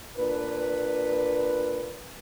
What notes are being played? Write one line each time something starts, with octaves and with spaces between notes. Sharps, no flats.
A#2 D4 B4